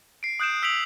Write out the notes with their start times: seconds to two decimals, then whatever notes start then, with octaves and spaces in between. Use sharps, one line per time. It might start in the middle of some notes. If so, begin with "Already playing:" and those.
0.23 C7 D7
0.40 D#6 F#6 G6 D7 E7
0.62 E6 B6 D7 F7 F#7